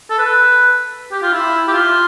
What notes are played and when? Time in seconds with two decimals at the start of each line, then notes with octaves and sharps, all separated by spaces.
0.10 A4
0.18 B4
1.11 G4
1.22 F4
1.33 E4
1.68 G4
1.73 F4